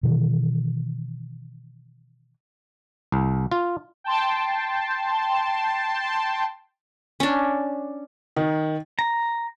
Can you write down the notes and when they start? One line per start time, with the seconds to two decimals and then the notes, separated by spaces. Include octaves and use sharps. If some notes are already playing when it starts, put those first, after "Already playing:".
0.03 B2 D#3 E3
3.12 C2
3.52 F4
4.04 G5 A5 C6
7.20 C#4 D4
8.36 D#3
8.99 A#5